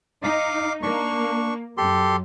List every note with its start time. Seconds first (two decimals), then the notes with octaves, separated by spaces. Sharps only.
0.24 D#4 F5 D6
0.83 A#3 D4 C#6
1.77 F#2 G4 A4 C6